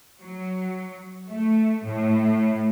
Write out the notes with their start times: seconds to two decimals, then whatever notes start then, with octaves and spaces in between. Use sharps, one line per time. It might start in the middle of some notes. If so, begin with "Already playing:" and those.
0.22 F#3
1.30 A3
1.85 A2